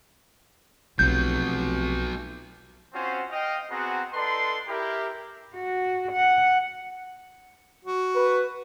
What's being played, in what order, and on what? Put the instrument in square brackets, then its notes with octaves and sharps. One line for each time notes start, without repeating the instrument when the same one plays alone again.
[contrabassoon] F1 [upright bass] B1 [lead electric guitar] F#3 B3 [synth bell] G6
[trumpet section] C4 C#4 F4 F#4 C5
D#5 F5 G5
B3 C4 F#4 G#4 F#5 A#5
D#4 A4 B4 D5 C6
E4 G4 A#4
[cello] F#4
F#5
[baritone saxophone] F#4
[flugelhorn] B4